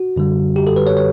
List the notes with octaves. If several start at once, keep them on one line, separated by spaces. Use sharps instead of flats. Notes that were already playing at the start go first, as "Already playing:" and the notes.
Already playing: F#4
F#2 D3 G3
G4
A4
B4
C#5
C#5